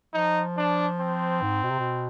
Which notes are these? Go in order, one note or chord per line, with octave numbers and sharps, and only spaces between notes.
F3 D#4
D4
C4
G#2
B2
C3
B2